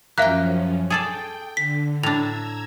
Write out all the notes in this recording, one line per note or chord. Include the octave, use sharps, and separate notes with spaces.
F#2 F3 A#3 C#4 E5 F5 G5 F#6
G#4 A4 D5 G5
D3 B6
A2 D4 A#5 E6 G#6 F7